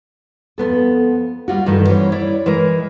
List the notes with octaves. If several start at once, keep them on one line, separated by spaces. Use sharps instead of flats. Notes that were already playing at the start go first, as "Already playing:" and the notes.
F2 G#2 B3 A4
G3 F4 F#4
G2 D#3 E3 A3
E3 G3 C#4 C5 C#5
E4 C#5 D5
E3 G#3 A#4